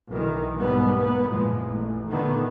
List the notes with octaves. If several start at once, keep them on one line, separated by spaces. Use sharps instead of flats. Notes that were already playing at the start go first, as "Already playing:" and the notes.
B1 D#3 E3
D#2 G#2 B2 G3 B3
A#3 B3
F#1 E2 A#2 F3 G#3
A1
A#2 D3 D#3 A3 B3